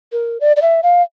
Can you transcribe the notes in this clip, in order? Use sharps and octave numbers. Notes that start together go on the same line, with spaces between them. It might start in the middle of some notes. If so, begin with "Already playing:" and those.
A#4
D5
D5
E5
F5